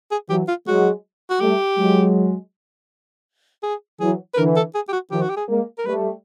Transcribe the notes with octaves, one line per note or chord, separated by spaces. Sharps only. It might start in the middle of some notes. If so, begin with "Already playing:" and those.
G#4
E3 F#3 G4
F4
F#3 G#3 F#4
F#4
G3 A3 G4
F#3 G#3
G#4
E3 F#3 G#4
B4
D3 E3 A#4
A4
G#4
G4
F#4
D#3 F3 G4
F#4
G4
G#4
G#3 A#3
A#4
G3 A3 B4